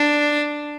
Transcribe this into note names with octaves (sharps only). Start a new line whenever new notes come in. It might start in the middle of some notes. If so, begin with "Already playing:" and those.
Already playing: D4